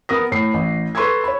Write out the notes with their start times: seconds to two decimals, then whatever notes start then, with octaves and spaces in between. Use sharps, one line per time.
0.09 B3 A#4 D#6 A#6
0.32 A2 C7
0.54 A1
0.95 A4 B4 C6 C#6 E6 G#6
1.24 C#5 B5